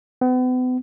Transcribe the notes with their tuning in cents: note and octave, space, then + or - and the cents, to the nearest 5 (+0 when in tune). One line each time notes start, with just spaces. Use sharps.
B3 +40